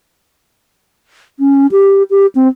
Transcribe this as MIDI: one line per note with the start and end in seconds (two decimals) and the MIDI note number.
1.40 1.67 61
1.72 2.03 67
2.10 2.26 67
2.35 2.48 60